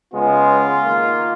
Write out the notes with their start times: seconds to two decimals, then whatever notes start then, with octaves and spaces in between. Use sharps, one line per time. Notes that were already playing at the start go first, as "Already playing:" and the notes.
0.12 C#3 G#3 B3 F4
0.82 D#3 A#3